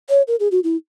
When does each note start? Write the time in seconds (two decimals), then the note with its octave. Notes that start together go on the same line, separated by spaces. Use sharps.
0.10 C#5
0.28 A#4
0.40 G#4
0.52 F#4
0.64 E4